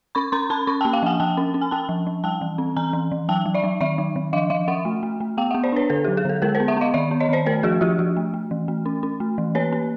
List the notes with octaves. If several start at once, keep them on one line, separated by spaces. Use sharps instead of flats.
C#4 B5 C#6
C#4 A#5 C6
C#4 A5 B5
C#4 B5 C#6
G5 A5
A#3
F5 G5
F3 F#5 G#5
F3 G5 A5
C#4
C#4
G#5
C#4 G5 A5
F3
F3
G3 G5 A5
E3
C4
E3 G#5 A#5
E3
E3
F#3 G5 A5
F#3
D5 E5
F#3
D#3 D5 E5
F#3
D#3
F3 D#5 F5
F3 D#5 F5
C#4 E5 F#5
A3
A3
A3
B3 F5 G5
E5 F#5
B3
C5 D5
D4 B4 C#5
D3 A4 B4
F#3 G4
G#4
D3 A4
G#3 G#4 A#4
A#4 C5
B3
E5 F#5
B3 D#5 F5
D#3 D5 E5
B3
C#5 D#5
D#3 C5 D5
A3 A#4 C5
F3 F#4 G#4
F3 F4 G4
F3 F#4
A3
A3
E3
A3
C#4
C#4
A3
E3
A#3 B4 C#5
A#3